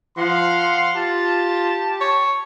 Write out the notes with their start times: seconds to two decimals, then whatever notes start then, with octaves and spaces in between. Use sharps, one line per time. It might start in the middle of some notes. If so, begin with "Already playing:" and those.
0.17 F3 F5 F#5 C6
0.96 F4 G4 A5
2.01 C#5